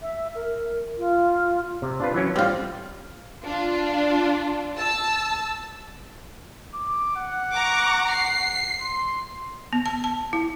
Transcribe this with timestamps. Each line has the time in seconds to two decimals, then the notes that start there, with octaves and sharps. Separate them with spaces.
0.02 E5
0.34 A#4
0.98 F4
1.82 C3
2.00 D4 F4 B4
2.14 E3 F#3 C#4
2.36 G3 C4 F4
3.44 D4 F4
4.77 A5 E6
6.74 D6
7.16 F#5
7.53 A#5 C#6 D6
8.12 C7
8.81 C6
9.73 B3
9.86 A5
10.04 A5
10.33 E4